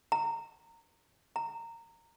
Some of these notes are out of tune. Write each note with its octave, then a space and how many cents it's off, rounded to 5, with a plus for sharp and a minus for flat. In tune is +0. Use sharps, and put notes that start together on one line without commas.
A#5 -25
A#5 -20